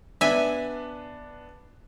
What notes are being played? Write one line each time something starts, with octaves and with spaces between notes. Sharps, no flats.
B3 D4 E5 G#5